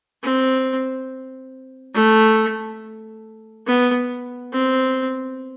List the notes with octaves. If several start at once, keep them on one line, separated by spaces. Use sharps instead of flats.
C4
A3
B3
C4